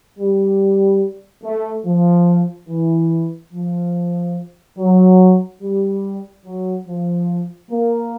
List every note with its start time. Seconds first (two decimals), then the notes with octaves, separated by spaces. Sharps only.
0.19 G3
1.44 A3
1.86 F3
2.69 E3
3.53 F3
4.79 F#3
5.62 G3
6.46 F#3
6.87 F3
7.71 A#3